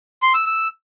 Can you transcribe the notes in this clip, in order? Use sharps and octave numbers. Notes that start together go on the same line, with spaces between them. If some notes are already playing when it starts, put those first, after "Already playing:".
C6
E6
E6